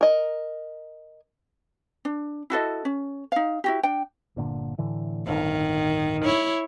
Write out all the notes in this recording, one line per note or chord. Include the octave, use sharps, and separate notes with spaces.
A#4 D#5
D4
E4 F#4 A4 D#5
C#4
D#4 F5
E4 F#4 G4
D4 G5
G1 A#2 D3
A2 D3 E3
D1 G1 D#3
E4 C#5